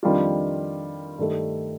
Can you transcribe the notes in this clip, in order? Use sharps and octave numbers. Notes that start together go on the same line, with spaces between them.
F2 D#3 G3 D4 F4
G2 D#3 A3